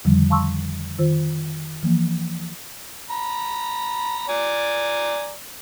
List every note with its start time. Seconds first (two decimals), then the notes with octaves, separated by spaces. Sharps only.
0.05 F2 D3 D#3 F3 G3
0.30 F5 A5 C6 C#6 E6
0.99 D#3 F4 C5
1.83 E3 F3 A#3
3.10 A#5 B5
4.29 D5 G#5 A#5